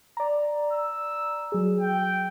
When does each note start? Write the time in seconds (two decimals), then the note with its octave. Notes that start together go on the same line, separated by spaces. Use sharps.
0.17 D5 A#5
0.73 E6
1.52 F#3 G#4
1.80 G5